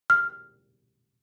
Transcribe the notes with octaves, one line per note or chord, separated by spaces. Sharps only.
F6